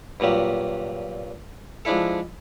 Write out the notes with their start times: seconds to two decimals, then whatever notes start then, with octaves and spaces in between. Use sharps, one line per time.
0.20 G2 A#2 F#3 G3
1.85 F3 G#3 D4 E4 A4